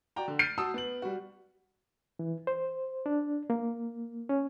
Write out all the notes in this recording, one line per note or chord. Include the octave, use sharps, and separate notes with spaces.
F#4 D5 G5 A#5
D3
F6 G6 A6 C7 D7 D#7
F#4 A5 D#6 E6
B3 F#7
G3 F#4
E3
C5
D4
A#3
C#4